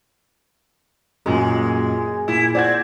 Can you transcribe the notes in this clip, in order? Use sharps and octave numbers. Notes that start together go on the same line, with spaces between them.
F#2 A#2 G#3
A#2 E4
C4 D5 F#5 G#6